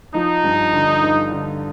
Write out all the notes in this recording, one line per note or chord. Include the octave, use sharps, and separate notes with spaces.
F3 D#4
G2
D3
G2
D3